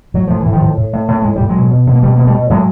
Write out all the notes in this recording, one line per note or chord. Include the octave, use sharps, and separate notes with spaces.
A2 F#3
A2 F3
E3
A2
D#3 F3
A2
A2
A2
A2 A3
A2 G#3
A2 G3
F#3 G#3
B2
B2
B2
A#3
B2 G3 A3
B2 A#3
G3 A3
B2
A2 F#3 G#3